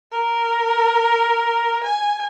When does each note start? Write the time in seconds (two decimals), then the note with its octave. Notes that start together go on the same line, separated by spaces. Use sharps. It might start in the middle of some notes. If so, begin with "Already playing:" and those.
0.12 A#4
1.84 G#5